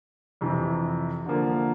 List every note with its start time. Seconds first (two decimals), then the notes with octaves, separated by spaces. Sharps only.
0.41 F2 C3 E3
1.26 D3 F3 A#3